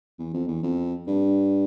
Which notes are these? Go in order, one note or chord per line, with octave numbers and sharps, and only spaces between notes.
E2
F2
E2
F2
G2